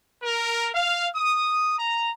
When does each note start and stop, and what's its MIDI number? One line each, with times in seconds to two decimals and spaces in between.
0.22 0.68 70
0.73 1.06 77
1.15 1.75 87
1.77 2.09 82